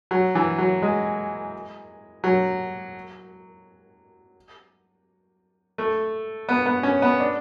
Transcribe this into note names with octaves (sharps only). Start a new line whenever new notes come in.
F#3
E3
F#3
G#3
F#3
A3
B3
B3
C#4
B3
D4